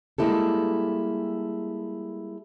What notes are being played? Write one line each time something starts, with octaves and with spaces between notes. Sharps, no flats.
G3 G#3 A#3 E4 G4 A4